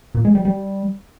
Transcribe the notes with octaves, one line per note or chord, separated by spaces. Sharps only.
A#2
G#3
G3
G3